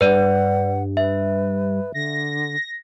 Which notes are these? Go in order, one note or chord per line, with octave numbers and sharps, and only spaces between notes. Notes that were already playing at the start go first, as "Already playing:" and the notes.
G2 B4 D5 F#5
B4 E5
D3 A#6